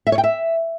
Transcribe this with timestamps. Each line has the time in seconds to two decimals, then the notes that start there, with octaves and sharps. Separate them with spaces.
0.07 E5
0.12 C#5
0.18 G5
0.24 E5